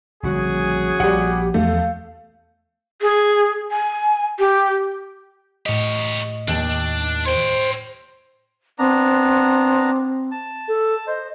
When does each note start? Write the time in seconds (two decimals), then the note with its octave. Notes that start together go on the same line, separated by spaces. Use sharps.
0.23 A#1 D3 G3 C#4 F#4 G#4
1.00 A#1 G3 G4 F#5
1.54 E2 F3 A3 B3 F5
3.02 G#4
3.71 G#5
4.39 G4
5.66 A2 G4 C#5 D#5
6.48 D#2 D4
7.26 C5 C#5 G5
8.79 B3 C4 D4 A#5
10.31 A5
10.68 A4
11.07 C5 D#5